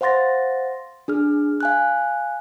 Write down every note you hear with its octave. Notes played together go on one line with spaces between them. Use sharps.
C5 F5 F#5 C6 A6 A#6
D4 G#4 F6
F5 G#5 F#6